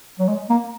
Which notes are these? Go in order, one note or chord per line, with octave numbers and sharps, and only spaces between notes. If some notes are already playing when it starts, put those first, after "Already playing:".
F#3
G#3
A#3